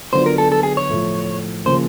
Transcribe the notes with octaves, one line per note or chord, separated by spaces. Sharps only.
D3 F#3 B3 D4 F4 C5
A#4
A4
A4
G#4
C#5
A2 F3 A3
C#3 F3 A#3 C5